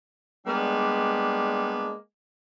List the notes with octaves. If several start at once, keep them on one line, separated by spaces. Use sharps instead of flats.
G3 G#3 A#3 B3 D4